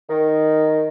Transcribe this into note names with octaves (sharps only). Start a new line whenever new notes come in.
D#3